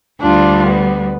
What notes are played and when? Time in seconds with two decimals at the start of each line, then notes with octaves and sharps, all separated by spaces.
0.21 D2 G3 D4 F4
0.67 B3